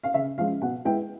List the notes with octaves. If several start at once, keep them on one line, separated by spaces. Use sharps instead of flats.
F5
C#3 E5
F3 G#3 C#4 F5
B2 F#5
G#3 B3 E4 G5